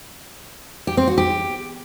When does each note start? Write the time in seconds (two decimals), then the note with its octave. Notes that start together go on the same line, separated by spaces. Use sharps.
0.87 G4
0.97 C4
1.07 F#4
1.18 G4